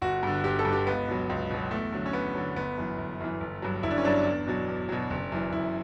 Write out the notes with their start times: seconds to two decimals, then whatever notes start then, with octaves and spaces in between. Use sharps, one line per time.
0.02 G1 F#4
0.23 G2 D3
0.44 G1 G4
0.59 A4
0.65 G2 D3
0.73 G4
0.87 C#2 B3
1.08 B2 F#3
1.29 C#2
1.50 B2 F#3
1.71 E2 A3
1.93 D3 F#3
2.06 C#4
2.13 E2 B3
2.35 D3 F#3
2.56 G1 B3
2.78 F#2 E3
2.98 G1
3.20 F#2 E3
3.40 G1
3.62 G2 F#3
3.83 G1 E4
3.91 D4
3.98 C#4
4.04 G2 F#3 D4
4.25 E2
4.47 B2 F#3
4.68 E2
4.89 B2 F#3
5.11 F#1
5.32 F#2 E3
5.52 F#1 E4